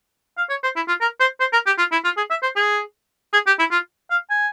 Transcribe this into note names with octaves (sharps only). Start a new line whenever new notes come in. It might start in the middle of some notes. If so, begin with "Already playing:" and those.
F5
C#5
C5
E4
F4
A#4
C5
C5
A#4
G4
F4
E4
F4
G#4
E5
C5
G#4
G#4
G4
E4
F4
F5
G#5